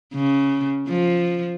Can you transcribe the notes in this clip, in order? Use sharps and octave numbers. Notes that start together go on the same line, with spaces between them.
C#3
F3